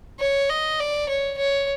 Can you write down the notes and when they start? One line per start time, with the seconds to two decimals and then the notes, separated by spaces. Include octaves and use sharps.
0.20 C#5
0.50 D#5
0.80 D5
1.09 C#5
1.38 C#5